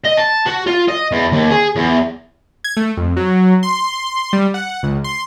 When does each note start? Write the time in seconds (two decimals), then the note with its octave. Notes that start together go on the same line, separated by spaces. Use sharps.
0.04 D#5
0.17 A5
0.46 F#4
0.67 F4
0.89 D#5
1.12 E2
1.32 D#2
1.50 G#4
1.76 E2
2.64 G#6
2.77 A3
2.97 F2
3.17 F#3
3.63 C6
4.33 G3
4.54 F#5
4.83 C#2
5.04 C6